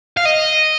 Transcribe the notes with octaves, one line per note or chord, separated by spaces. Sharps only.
F5
D#5